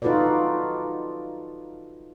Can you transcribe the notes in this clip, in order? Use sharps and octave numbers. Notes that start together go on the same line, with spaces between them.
D#4 F4 F#4 A4 B4 D5